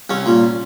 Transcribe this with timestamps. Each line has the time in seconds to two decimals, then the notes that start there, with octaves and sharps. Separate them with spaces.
0.09 C2 C#4
0.26 A#2